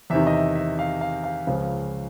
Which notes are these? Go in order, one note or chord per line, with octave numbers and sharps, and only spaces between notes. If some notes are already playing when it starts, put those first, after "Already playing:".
E2 C3 D#3 E5
D#5
E5
E5
F5
F5
F5
C#2 C#3 F3